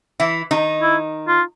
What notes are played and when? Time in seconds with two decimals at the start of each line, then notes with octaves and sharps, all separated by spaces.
0.20 E3 E4
0.51 D#3 D#4
0.82 E4
1.28 F4